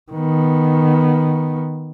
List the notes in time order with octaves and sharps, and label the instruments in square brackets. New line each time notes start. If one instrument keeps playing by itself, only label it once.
[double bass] D#3 B3